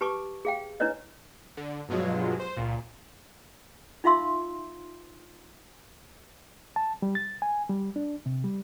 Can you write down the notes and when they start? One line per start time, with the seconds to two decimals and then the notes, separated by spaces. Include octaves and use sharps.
0.01 G4 B4 A5 C#6 D6
0.45 G#4 F5 G5
0.80 D4 E4 B4 C#5 D#5
1.57 D3
1.89 G2 B2 F3 F#3 G#3
2.40 C5
2.57 C#2 A#2
4.04 D#4 F4 E5 F5 C6 E6
6.76 A5
7.02 G3
7.15 A6
7.42 G#5
7.70 G3
7.96 D4
8.26 C3
8.44 G3